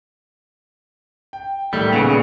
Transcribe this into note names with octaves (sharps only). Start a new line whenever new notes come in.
G5
A2 D#3 G3 A3
A#2 C#3 G#3 B3